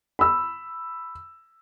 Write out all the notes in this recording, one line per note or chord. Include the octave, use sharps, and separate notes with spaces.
B5 E6